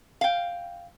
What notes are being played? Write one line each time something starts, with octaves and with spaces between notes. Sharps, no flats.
F5 G5